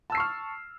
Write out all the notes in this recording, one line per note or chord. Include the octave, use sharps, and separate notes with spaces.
A5 C#6 E6 F6 C7